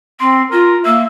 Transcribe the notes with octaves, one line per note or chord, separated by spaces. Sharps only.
C4 C6
F4 A#4
A#3 E5